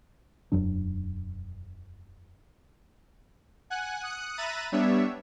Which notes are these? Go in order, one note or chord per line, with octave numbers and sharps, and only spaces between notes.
E1 F#2 F#3 D4
F#5 G#5 F#6
D#6 F#6 C#7
E5 A#5 B5 F#6 A6 D#7
G3 B3 D4 C#5 E5